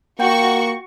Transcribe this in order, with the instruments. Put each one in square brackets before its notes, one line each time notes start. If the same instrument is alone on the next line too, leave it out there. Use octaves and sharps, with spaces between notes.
[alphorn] A#3 [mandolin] F4 F#5 G5 [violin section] F#4 C#6